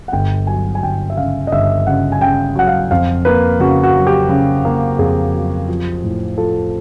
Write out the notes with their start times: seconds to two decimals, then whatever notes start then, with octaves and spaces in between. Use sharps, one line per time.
0.08 F#5
0.12 G1 G5
0.47 F#3 G#5
0.75 G#5
0.82 G1 G5
1.10 E5
1.17 C#3 F5
1.47 D#5
1.52 G1 E5
1.87 C#3 F#5
2.12 G#5
2.21 C#3 G5
2.55 F#3 F#5
2.67 F5
2.91 F2 F5
3.25 A#3 B4
3.60 C#3 F#4
3.84 F#4
3.95 F#3
4.07 G4
4.29 C#3
4.65 A#3
4.99 F2 G#4
5.34 F#3
5.68 F3
6.04 A2
6.38 F3 A4